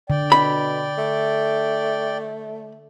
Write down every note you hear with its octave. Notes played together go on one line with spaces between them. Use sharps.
D3 D5 G5
B2 B5
A3